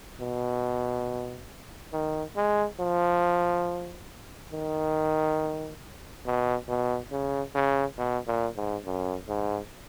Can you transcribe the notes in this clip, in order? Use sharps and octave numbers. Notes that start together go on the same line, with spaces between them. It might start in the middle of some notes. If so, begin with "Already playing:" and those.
B2
D#3
G#3
F3
D#3
B2
B2
C#3
C#3
B2
A#2
G#2
F#2
G#2